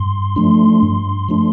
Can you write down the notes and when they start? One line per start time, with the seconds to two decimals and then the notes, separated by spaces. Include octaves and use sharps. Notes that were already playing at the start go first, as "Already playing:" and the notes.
Already playing: G2 C6
0.36 F3 A3 D4
0.82 G2
1.29 F3 A3 D4